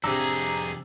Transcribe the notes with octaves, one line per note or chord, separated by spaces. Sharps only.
F2 C3 D4 G#4 A#5 E6